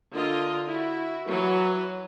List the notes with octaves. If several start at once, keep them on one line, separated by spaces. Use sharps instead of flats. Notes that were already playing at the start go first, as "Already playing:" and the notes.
D3 F4 A#4 D#5
E4 F#4
E3 F#3 B4